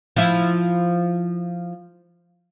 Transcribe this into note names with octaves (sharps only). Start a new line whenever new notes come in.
F3 E4